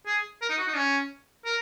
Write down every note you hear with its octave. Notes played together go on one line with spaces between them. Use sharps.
G#4
A#4
D#4
F#4
D#4
C#4
A#4